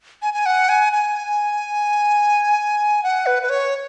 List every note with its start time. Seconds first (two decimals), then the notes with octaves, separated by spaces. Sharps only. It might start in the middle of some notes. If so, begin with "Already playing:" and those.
0.22 G#5
0.34 G#5
0.46 F#5
0.69 G#5
0.93 G#5
3.03 F#5
3.26 B4
3.43 B4
3.50 C#5